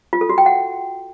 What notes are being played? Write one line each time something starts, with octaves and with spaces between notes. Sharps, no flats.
F4
A4
F#4
G5
F#5